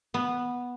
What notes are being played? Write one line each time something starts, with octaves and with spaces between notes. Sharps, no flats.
B3